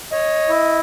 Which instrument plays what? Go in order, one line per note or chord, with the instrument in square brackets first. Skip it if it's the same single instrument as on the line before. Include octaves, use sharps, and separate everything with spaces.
[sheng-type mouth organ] C#5 [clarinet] D#5
[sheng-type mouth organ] E4